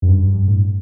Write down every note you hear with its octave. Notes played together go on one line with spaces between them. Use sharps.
F#2
G2
G2
A2